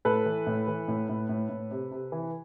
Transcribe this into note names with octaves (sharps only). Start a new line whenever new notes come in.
A2 A4 B4
E3
A2
E3
A2
A2
A2
A2
C3
C3
E3